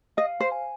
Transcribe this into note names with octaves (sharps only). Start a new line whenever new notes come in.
D#5 F5
C5
G#5